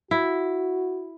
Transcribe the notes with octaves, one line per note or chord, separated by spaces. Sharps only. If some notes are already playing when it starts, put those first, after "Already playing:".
E4 F#4